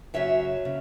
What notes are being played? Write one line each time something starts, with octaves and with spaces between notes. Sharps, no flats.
F#2 C#3 F#3 C#5 E5
C#3